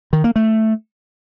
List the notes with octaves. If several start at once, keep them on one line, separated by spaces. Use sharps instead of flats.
D#3
A#3
A3